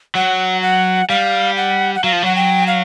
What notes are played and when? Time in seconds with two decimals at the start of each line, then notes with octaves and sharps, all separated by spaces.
0.15 F#3 F#5
0.62 F#5
1.09 G3 F5
1.57 F#5
1.95 F#5
2.04 F#3 F5
2.13 F3
2.23 F#3 F#5
2.36 G5
2.67 F5